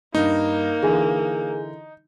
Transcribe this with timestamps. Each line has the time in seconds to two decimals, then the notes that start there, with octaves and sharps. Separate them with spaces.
0.15 G2 A#3 D#4
0.83 D3 E3 G#4 G#5